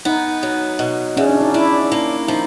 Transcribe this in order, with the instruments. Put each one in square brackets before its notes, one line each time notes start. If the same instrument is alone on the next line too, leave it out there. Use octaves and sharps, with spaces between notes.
[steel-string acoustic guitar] B3 [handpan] D#4
[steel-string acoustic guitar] F#3
B2
[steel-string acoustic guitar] E2 [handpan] C#4
[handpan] D4
D#4
[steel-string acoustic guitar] D4 [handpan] E4
[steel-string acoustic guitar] A#3
[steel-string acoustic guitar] F3 [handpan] D#4